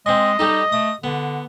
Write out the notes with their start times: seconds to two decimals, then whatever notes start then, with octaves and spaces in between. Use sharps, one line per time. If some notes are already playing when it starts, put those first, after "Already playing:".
0.06 G#3 C4 D#5 G#5
0.39 G3 D#4 G4 A4
0.72 A3 D#6
1.04 D3 B3